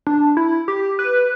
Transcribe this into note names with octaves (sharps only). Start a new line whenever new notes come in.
D4
E4
G4
B4